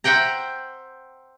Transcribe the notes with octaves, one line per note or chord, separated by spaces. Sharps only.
C5 E5 F#5 G5 A#5